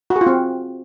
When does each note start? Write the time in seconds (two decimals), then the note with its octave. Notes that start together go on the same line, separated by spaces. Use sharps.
0.10 F#4
0.16 G#4
0.21 F4
0.26 C4